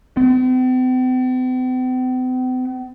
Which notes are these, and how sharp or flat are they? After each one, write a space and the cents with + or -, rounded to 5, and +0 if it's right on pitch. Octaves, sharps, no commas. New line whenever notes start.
C4 -45